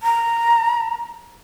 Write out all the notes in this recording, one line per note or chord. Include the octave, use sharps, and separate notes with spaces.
A#5